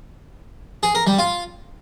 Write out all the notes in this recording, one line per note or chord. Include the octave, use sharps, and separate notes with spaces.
G#4
A#4
G3
F4